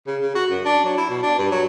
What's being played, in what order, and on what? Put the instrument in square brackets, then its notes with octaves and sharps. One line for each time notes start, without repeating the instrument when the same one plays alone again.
[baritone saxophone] C#3
C#3
F#4
F#2
D4
F#3
E4
B2
D4
G2
F#3